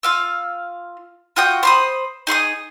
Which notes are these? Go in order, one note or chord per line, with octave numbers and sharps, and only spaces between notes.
F4 F5 E6
F4 F#4 G5 D#6
C5 B5 D#6
D#4 G#4 C6 D#6